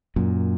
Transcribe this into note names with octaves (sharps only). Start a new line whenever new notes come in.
F#2 A#2